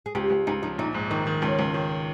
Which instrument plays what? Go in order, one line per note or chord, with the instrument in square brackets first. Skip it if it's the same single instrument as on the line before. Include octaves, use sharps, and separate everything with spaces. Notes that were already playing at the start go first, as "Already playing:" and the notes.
[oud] G#4
[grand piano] C#2 [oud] G4
[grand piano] C#2
[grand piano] C#2 [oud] D#4
[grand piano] F3 [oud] D#4
[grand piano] A#1 [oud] D#4
[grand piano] G#2
[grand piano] D#3 [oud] D#4
[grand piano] D#3
[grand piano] C#2 [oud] C#4
[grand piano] C#2
D#3